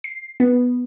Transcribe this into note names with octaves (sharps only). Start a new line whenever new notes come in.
C7
B3